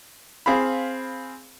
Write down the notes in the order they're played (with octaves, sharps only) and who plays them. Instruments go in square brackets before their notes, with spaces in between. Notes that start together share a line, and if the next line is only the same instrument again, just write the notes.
[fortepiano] C4 G#4 F5 B5